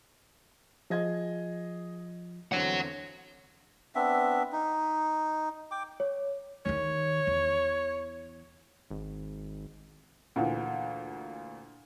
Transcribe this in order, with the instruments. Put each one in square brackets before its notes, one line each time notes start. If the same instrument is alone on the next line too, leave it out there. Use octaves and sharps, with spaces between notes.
[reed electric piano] F3 F4 [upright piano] G#4 D#5 G#6
[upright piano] E2 D3 C4 [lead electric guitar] C#5 F#5
[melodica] B3 C4 D4 E5
D#4
G5 D6
[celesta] C#5
[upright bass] D#2 D#3 [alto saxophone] C#5
[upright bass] E2
[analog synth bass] G#1
[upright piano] D2 A#2 E3